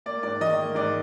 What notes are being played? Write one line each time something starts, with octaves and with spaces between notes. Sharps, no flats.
A#3 D5
G#2 D5
D#3 D#5
A#3
G#2 D5